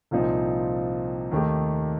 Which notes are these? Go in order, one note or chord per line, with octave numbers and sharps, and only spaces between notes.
C2 A#2 F3 C4 D#4
D#2 D#3 A3 D#4 G4